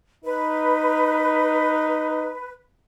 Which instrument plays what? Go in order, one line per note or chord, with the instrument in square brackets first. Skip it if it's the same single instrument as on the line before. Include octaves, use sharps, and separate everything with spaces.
[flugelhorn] D#4 [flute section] B4